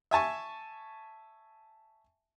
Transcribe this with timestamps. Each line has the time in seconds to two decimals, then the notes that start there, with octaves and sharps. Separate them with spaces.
0.11 E5 G#5 A5 C#6